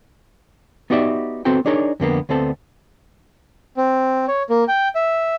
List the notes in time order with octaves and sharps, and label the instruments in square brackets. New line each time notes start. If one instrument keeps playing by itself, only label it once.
[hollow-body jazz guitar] B3 D#4 F#4 G4 D5 E5
B3 C4 F#4 A4 G5
D4 D#4 G#4 A#4 C#5 D5
F2 D3 A#3 B3
D2 B3 C4 A4
[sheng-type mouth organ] C4
C#5
A#3
G5
E5